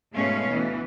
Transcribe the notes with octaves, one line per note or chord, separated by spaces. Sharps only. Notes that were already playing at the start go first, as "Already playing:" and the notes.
G#2 B2 G#3 A3 C#4 F5
D2 E3 B3